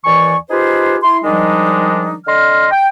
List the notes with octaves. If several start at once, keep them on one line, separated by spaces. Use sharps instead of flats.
D#2 E3 D5 G#5 C#6
D#4 F4 G4 G#4 B4 C5
E4 C6
D#3 F3 G3 G#3 D4 D#4
D3 D#5 C6 F6
G5